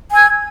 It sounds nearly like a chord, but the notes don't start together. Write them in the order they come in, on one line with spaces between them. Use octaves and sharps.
G#5 E6 G#6